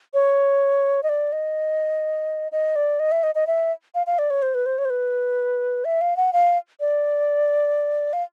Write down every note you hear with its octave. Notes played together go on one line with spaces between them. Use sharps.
C#5
D#5
D5
D#5
D#5
D5
D#5
E5
D#5
D#5
E5
F5
F5
D5
C#5
C5
B4
C5
C#5
C5
B4
E5
F5
F#5
F5
D5
F5